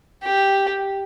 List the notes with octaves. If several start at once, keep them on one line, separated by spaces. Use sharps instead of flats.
G4